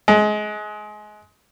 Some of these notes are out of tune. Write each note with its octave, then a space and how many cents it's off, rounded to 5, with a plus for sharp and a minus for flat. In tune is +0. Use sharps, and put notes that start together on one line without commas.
G#3 +30